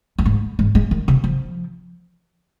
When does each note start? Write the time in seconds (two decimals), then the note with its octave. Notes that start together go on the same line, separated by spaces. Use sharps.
0.18 F2
0.26 G#2
0.59 G#2
0.75 G#3
0.91 D#3
1.08 C3
1.24 F3